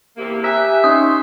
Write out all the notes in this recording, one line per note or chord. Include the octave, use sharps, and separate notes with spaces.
E2 C3 A#3 G4 E5
G4 E5 G#5 A#5 D#6 E6 F#6
C#4 D#4 G#5 C6 C#6 D#6